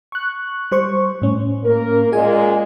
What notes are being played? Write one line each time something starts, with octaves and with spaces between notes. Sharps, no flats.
C#6 F#6
G3 C5 C#6
A2 C#4
A#3 A#4
A#2 G#3 F4 G#4 G#5